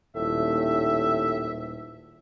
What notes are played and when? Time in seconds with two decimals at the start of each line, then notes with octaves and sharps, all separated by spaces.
0.15 D#1 A2 E5